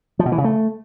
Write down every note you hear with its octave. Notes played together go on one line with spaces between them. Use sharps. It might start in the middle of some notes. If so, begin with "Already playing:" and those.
F3
B2
E3
C#3
A3